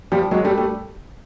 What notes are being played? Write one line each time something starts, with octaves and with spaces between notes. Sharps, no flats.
F3 G3
F#3 G#3
G3 A3
G3 A3